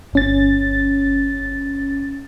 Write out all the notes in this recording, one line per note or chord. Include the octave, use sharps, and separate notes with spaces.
G1 C#4 A6